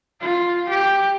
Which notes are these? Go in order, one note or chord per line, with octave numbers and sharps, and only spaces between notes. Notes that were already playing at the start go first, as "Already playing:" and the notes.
F4
G4